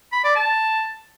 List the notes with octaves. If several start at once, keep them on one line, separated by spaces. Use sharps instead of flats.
B5
D5
A5